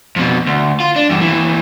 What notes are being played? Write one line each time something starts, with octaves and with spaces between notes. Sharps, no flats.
F2 B2
D2
F4
D4
E2 G2
D#2 E3